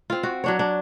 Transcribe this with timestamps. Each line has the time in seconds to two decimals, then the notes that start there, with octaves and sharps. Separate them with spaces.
0.10 C4 F4
0.23 F#4
0.44 F#3 D4 C#5
0.59 D4